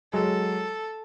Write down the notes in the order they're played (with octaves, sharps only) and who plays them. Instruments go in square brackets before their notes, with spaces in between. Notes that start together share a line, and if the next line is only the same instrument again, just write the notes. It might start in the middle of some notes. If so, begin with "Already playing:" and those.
[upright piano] F#3 G#3 [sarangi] A4